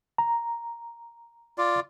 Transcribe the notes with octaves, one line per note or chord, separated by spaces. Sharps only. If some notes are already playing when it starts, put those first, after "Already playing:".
A#5
F4 D5